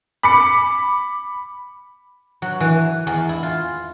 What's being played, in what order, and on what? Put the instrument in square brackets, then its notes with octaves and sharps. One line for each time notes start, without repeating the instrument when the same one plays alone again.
[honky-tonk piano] B5 D6 C#7
[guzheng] F#3
E3
E2
E4
F4